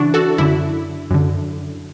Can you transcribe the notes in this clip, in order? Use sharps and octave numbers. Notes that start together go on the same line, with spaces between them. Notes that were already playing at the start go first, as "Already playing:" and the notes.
Already playing: C#3 E3 D4 E4 F#4
F#4 A4
F#2 D3 E4
F#2 D3